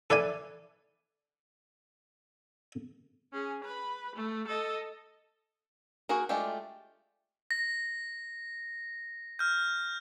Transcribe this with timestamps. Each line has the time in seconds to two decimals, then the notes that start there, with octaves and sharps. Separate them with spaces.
0.10 A4 B4 D5 E5 G#5
3.33 C#4 G#4
3.63 B4 B5
4.15 A3
4.47 A4 D#5
6.09 A#3 F#4 G#4 A#4
6.29 G#3 A3 D4 F4 G4
7.51 A#6
9.39 F6 G6